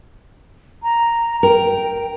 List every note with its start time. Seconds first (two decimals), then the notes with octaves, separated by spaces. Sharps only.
0.83 A#5
1.43 A#4 G5